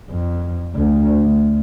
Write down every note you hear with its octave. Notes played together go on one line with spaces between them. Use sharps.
F2
D2
D2